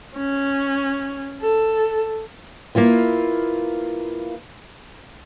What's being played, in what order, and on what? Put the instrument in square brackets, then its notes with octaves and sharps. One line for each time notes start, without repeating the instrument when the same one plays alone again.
[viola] C#4
A4
[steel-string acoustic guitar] A#3 E4 F4 B4